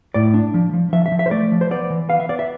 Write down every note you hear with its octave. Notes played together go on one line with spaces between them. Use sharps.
A2 D5
D4
F3
F3
F3 E5
E5
F3
E5
C5
A3 D5
F3
C5
B3 D5
E3
B3 F5
E5
B3 D5
E5